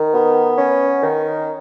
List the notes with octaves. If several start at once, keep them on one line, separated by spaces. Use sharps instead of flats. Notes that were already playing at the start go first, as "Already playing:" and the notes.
Already playing: D#3
B3
C#4
D#3